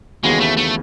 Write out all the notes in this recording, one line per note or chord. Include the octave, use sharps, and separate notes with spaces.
D#2 C#3 E3 G#3 B3 F#4
A3
A3